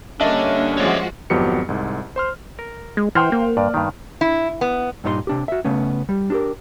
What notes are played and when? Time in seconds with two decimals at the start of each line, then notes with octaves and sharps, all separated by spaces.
0.21 D3 G3 A#3 C#4 D4 D#5 E5
0.78 F3 G#3 F#4 C#5 D5
1.30 G#1 F2 F#3 B3 G4 C#7
1.68 C2 G#2
2.16 C5 C6 F6
2.59 A#4
2.97 G#3
3.15 E3 C5 F#5 G5 C6 F6
3.32 A#3
3.57 G2 D5
3.74 G2 D#3
4.21 E4
4.61 B3
5.04 G2 A#2 D#4 B4 C6
5.27 C3 D4 G4
5.48 F#4 E5
5.65 C#3 A3 B3 C#4
6.09 G3
6.30 D4 G4 A#4